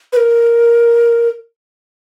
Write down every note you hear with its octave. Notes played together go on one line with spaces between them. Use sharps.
B4
A#4